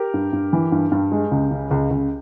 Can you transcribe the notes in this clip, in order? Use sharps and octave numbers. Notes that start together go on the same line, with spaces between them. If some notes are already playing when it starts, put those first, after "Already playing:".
Already playing: G4 A#4
G2
G2
E3
G2
G2
G#3
C#2
C#3
C#2
C#2